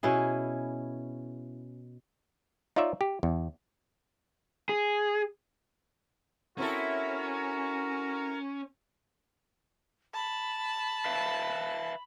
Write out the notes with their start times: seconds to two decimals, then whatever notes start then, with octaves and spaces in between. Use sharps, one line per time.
0.03 B2 C#4 E4 G#4
2.76 D#4 F4 C#5 D5 E5
3.01 G4
3.23 E2
4.69 G#4
6.58 C4 C#4 E4 F#4 A4 A#4 A#5
10.14 A5 B5
11.05 B4 E5 F5